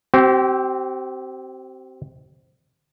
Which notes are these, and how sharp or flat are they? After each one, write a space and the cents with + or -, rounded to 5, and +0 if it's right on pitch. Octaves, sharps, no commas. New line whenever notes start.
C4 +0 G4 -40